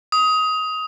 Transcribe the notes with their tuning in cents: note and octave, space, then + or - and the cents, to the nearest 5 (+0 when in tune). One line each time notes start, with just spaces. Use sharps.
D#6 +20